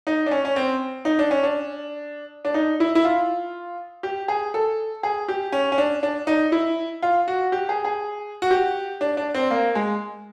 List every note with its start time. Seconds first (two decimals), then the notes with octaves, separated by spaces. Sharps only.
0.07 D#4
0.26 D4
0.31 C#4
0.45 C#4
0.56 C4
1.05 D#4
1.19 D4
1.31 C#4
1.43 D4
2.45 D4
2.54 D#4
2.80 E4
2.95 E4
3.05 F4
4.03 G4
4.28 G#4
4.54 A4
5.03 G#4
5.28 G4
5.52 C#4
5.72 C#4
5.78 D4
6.03 D4
6.27 D#4
6.52 E4
7.03 F4
7.28 F#4
7.52 G4
7.69 G#4
7.85 G#4
8.42 F#4
8.51 G4
9.01 D4
9.17 D4
9.35 C4
9.51 A#3
9.75 G#3